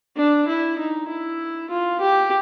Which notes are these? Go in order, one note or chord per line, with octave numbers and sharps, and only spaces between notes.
D4
E4
D#4
E4
F4
G4